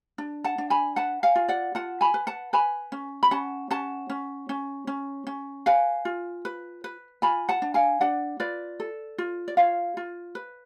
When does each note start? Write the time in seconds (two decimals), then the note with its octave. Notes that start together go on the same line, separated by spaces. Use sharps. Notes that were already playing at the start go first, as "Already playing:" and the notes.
0.18 D4
0.44 F#5 A5
0.58 D4
0.70 G#5 B5
0.96 B4 F#5 A5
1.23 F5 G#5
1.35 F4
1.48 D5 F#5
1.75 F4 F#5 A5
2.01 G#5 B5
2.14 B4
2.27 F#5 A5
2.53 B4 G#5 B5
2.92 C#4
3.23 B5
3.31 C#4 F#5 A5
3.71 C#4 F#5 A5
4.10 C#4
4.49 C#4
4.87 C#4
5.27 C#4
5.66 B4 F5 G#5
6.05 F4
6.45 B4
6.84 B4
7.22 F4 G#5 B5
7.49 F#5 A5
7.62 D4
7.74 F5 G#5
8.01 D4 D5 F#5
8.40 F4 B4 D5
8.80 A4
9.18 F4
9.48 D5
9.57 F4 C#5 F5
9.97 F4
10.35 B4